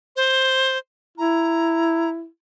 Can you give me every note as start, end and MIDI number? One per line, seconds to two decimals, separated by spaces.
0.16 0.78 72
1.18 2.26 64
1.18 2.10 82